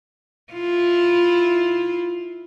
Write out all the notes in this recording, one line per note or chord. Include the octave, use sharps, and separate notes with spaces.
E4 F4